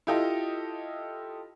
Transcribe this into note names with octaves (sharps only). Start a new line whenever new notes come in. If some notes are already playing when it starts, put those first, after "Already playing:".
E4 F4 G4 A4 D#5